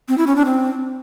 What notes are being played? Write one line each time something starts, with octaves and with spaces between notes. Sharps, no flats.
C4
E4
C#4
D4
C4